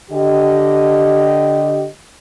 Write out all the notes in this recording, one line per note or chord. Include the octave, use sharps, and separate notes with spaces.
D3 G4 D#5